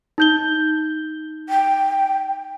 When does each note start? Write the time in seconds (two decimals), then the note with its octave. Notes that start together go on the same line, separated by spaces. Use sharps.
0.18 D#4 G6 G7
1.49 G5